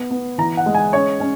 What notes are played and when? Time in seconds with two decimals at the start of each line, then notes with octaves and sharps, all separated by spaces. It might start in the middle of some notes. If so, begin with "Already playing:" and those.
Already playing: B3
0.11 B3
0.38 E3 A#5
0.57 F#5
0.66 G#3
0.74 G#5
0.93 C#4 C#5
1.20 C#4